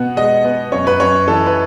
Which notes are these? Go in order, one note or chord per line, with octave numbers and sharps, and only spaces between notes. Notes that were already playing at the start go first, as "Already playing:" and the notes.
Already playing: B2 B3 F#5
G#3 D#5
B3
F#2 C#5
B4
F#2 C#5
E3 A4
B4